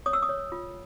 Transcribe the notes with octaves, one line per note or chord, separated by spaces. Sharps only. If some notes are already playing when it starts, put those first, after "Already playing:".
C#5 D#6
E6
D#6
C#5
F4